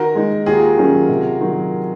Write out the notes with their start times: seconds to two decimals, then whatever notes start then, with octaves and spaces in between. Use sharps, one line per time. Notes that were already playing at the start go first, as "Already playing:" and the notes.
Already playing: D#3 F#4 A#4
0.15 G#3 D#4
0.46 D#2 F4 G#4
0.78 D#3 F#3 C#4
1.09 C3
1.40 D#3 F#3